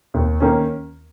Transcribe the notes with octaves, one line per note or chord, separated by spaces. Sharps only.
D#2
D#3 A#3 C#4